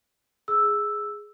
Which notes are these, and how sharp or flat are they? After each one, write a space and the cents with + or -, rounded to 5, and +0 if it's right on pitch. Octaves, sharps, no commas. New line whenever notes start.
G#4 +0 E6 +0